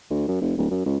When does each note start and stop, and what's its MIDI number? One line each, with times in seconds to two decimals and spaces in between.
0.11 0.25 38
0.28 0.37 42
0.41 0.54 29
0.58 0.66 26
0.71 0.84 42
0.86 0.98 37